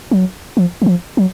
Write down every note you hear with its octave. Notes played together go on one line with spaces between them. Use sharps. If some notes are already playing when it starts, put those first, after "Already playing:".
F#3
F3
E3
F3
F#3